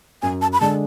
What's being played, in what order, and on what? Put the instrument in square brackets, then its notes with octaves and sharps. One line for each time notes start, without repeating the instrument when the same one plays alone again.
[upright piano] F#2 [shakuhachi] G#5
[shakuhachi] A5
B5
[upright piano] D3 G#3 D4 [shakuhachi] A5